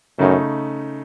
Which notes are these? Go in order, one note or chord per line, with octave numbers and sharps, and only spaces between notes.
F#2 C#3 A3 D#4